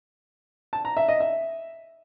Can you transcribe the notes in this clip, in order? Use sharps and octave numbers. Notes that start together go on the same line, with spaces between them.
A5
A#5
E5
D#5
E5